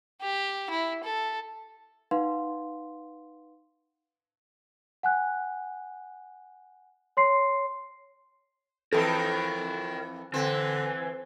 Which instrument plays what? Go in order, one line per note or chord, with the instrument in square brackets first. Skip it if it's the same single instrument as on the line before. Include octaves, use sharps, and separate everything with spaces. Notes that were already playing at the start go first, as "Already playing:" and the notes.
[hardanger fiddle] G4
E4
A4
[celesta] D#4 B4 F5 F#5 C6
F#5 G#5 F#6
C#5 C6 C7
[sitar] F2 E3 [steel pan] A4 [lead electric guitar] A#4 G5
[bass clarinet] D3 [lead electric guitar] E3 [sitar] C4